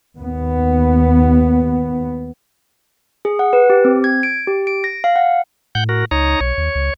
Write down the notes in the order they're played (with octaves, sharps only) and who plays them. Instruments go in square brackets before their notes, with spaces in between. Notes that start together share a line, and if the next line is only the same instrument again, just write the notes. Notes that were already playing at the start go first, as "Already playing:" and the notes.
[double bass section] D#2 B3
[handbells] G#4
F#5
B4
G4
C4
G#6
D7
G4
D7
A#6
F5
F#5
[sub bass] A2 [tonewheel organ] F#5 G6
[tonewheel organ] F#4 A#4
[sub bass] C#2 [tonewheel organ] D#4 C#5 A#5
[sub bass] B1 [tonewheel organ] C#5
[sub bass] D#2
C#2